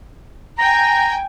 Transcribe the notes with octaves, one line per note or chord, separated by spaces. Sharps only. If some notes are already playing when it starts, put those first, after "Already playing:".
G5 G#5 A#5